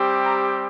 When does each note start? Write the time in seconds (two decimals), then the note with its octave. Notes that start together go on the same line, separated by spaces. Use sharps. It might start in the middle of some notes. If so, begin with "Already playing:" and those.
Already playing: G3 C4 G4
0.22 A#5